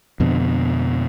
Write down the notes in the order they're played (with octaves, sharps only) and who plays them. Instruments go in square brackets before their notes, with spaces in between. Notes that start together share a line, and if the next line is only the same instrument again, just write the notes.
[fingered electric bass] F2 B2 D3